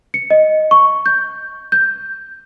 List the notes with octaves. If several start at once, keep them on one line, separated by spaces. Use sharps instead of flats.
C#7
D#5
C#6
G6
G6